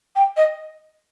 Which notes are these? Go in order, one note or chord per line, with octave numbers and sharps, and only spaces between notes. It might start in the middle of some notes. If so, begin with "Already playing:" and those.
G5
D#5